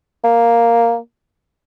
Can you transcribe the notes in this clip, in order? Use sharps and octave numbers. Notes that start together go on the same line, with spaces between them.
A#3